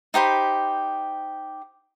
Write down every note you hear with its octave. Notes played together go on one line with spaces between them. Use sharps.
D#4 G4 C5 B5